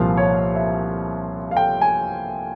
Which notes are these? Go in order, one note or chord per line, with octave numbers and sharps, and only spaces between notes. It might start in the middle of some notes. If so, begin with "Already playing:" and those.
Already playing: C2 A#2 F3 A#3 F5
C#5
E5
F5
G5
G#5